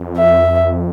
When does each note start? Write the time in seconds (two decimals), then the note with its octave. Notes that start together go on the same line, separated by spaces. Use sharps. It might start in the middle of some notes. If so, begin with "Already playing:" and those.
Already playing: F2
0.17 E5